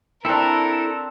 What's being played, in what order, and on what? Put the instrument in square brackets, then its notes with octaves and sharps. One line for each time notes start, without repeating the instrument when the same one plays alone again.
[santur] C4 D4 [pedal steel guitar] E4 A4 [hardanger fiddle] A#4